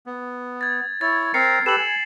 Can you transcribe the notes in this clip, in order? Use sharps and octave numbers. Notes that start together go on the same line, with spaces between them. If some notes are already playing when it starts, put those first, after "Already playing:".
B3
G#6 A6
E4 C#5 A6
C4 A#4 A#5 C7 C#7
G4 A4 B4 E7 F#7
G#5